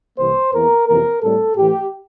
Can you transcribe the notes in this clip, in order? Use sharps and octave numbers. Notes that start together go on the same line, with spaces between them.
C2 C3 E3 A#3 C5
E2 E3 A#3 A#4
F2 C3 E3 A#3 A#4
A2 G3 C4 A4
A2 E3 A3 G4